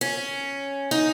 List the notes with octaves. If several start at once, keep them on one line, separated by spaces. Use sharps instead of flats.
C#4
D#4